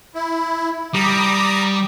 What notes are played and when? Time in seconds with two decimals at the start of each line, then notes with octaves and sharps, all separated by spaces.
0.15 E4
0.94 G3 A#5 D6 D#6